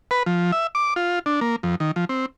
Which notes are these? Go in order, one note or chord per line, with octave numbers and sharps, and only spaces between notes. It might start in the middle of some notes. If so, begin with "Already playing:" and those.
B4
F3
E5
D6
F4
D4
A#3
F2
D#3
F3
C4